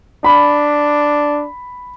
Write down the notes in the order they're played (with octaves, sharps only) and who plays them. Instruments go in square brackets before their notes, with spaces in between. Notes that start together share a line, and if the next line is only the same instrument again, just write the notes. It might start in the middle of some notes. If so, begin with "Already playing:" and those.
[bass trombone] D4 [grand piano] B5